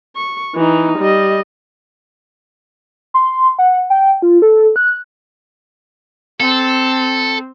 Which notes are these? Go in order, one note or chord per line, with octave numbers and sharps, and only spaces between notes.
C#6
E3 D#4
G3 D#5
C6
F#5
G5
F4
A4
F#6
C4 A4